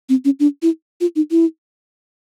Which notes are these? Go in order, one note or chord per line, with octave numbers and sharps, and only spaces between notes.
C4
C#4
D4
E4
F4
D#4
E4